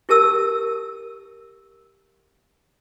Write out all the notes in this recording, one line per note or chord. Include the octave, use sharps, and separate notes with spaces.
E4 G4 A#4 A5 E6